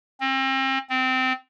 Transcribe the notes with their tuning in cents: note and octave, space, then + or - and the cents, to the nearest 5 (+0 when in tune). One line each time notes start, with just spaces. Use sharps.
C4 +35
C4 -20